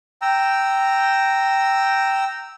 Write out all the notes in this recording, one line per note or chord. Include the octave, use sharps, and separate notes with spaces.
G5 A#5 E6